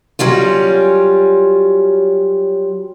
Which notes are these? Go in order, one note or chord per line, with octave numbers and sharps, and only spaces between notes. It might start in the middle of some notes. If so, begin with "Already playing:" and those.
F#3 G3 C#4 F4